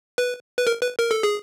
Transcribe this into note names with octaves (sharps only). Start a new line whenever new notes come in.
B4
B4
A#4
B4
A#4
A4
G#4